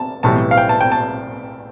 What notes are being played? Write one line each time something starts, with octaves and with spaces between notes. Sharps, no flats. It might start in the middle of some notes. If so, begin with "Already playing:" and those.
Already playing: A5
B1 A2 E3 G3 A5
F5
G5
A5
G5
A5